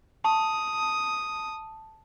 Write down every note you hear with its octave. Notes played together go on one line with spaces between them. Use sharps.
A5 D#6